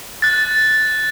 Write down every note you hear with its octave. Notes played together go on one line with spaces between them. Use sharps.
F#6 A6